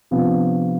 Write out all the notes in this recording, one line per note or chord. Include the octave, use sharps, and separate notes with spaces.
C3 F3 B3 D4